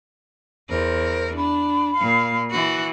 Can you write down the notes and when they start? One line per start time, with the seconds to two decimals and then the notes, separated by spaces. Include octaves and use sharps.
0.70 E2 A#4 C5
1.37 D4 B5
1.97 A#2 F5
2.51 E3 F#4